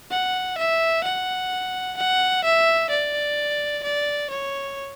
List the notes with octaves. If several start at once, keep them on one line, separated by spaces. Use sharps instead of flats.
F#5
E5
F#5
F#5
E5
D5
D5
C#5